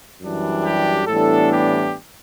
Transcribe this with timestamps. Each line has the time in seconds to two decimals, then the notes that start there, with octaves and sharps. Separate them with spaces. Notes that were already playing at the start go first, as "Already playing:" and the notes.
0.22 F#2 E3 G3 D4
0.64 G4
1.07 A2 E3 G3 B3 D4 A4
1.51 G4